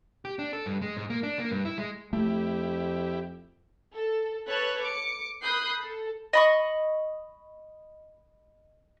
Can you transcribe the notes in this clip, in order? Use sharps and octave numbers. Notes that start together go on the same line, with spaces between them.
G4
D4
A4
G2
G#3
G#2
A#3
D4
A#3
G2
E4
G#3
F2 A3 E4 G4
A4
A4 B4 C#5 A5 F#6
D6 C#7
B5 D#6 F#6 G6 C7
A4
D#5 B5 C#6